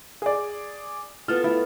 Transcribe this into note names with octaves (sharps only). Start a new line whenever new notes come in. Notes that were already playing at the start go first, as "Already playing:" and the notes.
G#4 D5
B3 F4 A4 F6
A3 E4